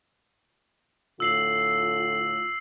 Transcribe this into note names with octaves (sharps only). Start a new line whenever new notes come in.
A2 D3 F4 E6 C7 F#7